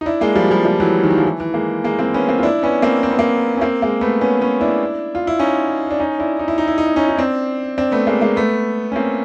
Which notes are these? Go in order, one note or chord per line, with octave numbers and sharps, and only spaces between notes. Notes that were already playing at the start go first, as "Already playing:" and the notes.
D#4
D4 E4
G#3 A#3
F3 G3
F3 G3
F3 G3
E3 F#3
D#3
E3
F3
E3
E3
G#3 A#3
G#3 A#3
A#3 C4
B3 C#4
A#3 C4
F4
D4 E4
B3 C#4
A#3 C4
C4
B3
A#3 C4
C#4
A#3 C4
G#3 A#3
A3 B3
B3 C#4
B3 C#4
D4 E4
F4
E4
C#4 D#4
D4
C#4 D#4
D4 E4
D#4
E4
D#4
E4
D#4
E4
C#4 D#4
D#4
C4 D4
C4 D4
A3 B3
G#3 A#3
G#3 A#3
A3 B3
C#4
A#3 C4